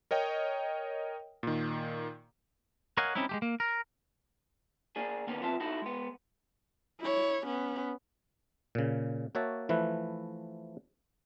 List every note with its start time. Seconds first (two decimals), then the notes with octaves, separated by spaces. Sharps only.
0.11 A#4 C#5 D#5 G5
1.43 A#2 D#3
2.97 A#4 C#5 D#5 F5 F#5 G#5
3.15 G3 C4 C#4 D#4 E4
3.29 G#3 A3 G4
3.42 A#3
3.60 A#4
4.96 A#3 D4 G#4
5.27 D3 D#3 A#3 B3 C#4
5.42 F3 C4 F4 B4 E5 A5
5.60 D#4 E4 F#4 A4
5.82 G#3 B3
7.01 E4 C#5
7.46 B3 C#4
8.75 A#2 C#3
9.35 A#3 F#4 C#5 E5 A5
9.69 E3 F3 A3 E4 B4